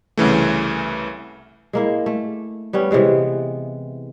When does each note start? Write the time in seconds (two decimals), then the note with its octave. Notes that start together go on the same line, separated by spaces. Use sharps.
0.17 C2 C#3 E3 A3
1.73 G#3 A#3 E4
2.06 A3
2.73 G3 B3 C#4
2.91 C3 E3 G#3 B3